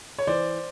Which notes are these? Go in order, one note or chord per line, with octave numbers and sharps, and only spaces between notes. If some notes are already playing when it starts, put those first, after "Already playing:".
C#5
E3 C5 D5